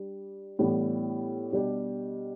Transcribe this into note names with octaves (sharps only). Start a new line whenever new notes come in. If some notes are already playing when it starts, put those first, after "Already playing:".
Already playing: G3 D4 G4
A2 E3 G3 B3 D4
B2 G3 D4 G4